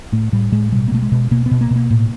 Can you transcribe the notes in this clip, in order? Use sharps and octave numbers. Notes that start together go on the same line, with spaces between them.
A2 A3
A2 G3
A2 G#3
B2 G3
A#3
B2 A3
G#3
B2
B2 A#3
B3
B2
A#3
B2
A#3
A2